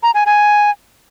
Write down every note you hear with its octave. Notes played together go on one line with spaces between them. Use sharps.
A#5
G#5
G#5